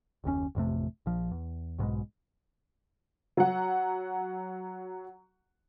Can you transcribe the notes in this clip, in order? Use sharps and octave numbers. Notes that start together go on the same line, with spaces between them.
F#1 D#2 C3 C#4
A1 F2 C3 A3
A#1 F3
E2
B1 G#2 B2 G#3
F#3 F#5